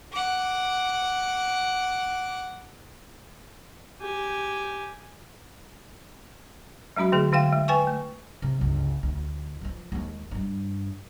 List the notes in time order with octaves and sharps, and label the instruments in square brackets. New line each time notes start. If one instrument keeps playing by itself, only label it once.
[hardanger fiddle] F#5 D6
[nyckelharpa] G4 G#5
[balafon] F#3 G#3 C#4 F#4 B5
D3 A3 G#4
D3 G#3 F5 G5
G#3
B4 G5 G#5 C#6
A3
[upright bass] C3
G1 C#2
D2
E3 F3
D#2 G#3
G2 G3